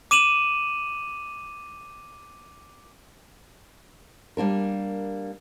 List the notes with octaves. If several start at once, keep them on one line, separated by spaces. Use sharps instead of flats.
D6 D#7 E7 F#7
G3 A#3 D4 A#4